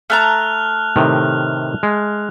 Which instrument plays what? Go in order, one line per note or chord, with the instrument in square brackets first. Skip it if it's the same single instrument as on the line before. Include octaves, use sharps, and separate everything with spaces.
[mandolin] A3 A5 A#5 [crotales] F6 F#6 F7
[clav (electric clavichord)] A2 C3 D#3
G#3